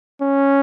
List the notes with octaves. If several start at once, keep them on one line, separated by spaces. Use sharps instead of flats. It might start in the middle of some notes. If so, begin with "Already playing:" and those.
C#4